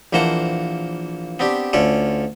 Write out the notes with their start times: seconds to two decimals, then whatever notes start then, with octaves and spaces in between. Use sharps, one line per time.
0.13 A#1 E3 A#3 C5 F#5 A5
1.39 B3 C4 D4 G4
1.73 D2 C#4 F4 A4 D5